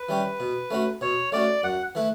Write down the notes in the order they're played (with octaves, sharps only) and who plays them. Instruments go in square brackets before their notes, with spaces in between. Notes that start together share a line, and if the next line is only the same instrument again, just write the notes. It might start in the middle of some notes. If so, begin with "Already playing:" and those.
Already playing: [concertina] B4
[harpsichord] E3 G3 C#4 G4
B2
A3 C#4 F#4
[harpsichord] B2 [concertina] C#5
[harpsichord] A3 C#4 F#4 [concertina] D5
[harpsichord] F#2 [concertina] F#5
[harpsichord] E3 A3 E4 B4